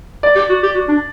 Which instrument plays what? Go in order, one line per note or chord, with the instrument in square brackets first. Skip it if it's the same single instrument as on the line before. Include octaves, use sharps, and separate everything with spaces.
[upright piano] D5
[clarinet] G4
F#4
G4
F#4
D4